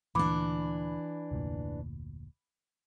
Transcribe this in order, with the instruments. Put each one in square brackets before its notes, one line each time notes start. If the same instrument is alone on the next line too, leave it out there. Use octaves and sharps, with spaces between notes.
[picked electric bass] D2 A#2 [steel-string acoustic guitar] E3 D4 [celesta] B5 D6
[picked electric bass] F1 D2 A#2